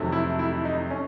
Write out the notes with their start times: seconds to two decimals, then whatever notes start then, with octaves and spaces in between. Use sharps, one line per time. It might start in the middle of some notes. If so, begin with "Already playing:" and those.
Already playing: F2 C3 D#3 F#3 A3
0.12 E4
0.39 E4
0.54 E4
0.65 D#4
0.90 C#4